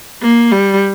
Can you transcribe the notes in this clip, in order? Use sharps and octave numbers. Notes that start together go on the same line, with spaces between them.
A#3
G3